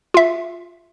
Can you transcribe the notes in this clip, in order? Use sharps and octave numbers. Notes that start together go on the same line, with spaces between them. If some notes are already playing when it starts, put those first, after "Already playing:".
F4 E5